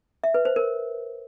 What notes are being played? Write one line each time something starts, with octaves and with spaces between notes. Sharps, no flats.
E5
B4
C5
A#4